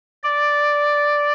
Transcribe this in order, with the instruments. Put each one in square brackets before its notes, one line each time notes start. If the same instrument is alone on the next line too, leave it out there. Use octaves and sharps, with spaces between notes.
[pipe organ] D5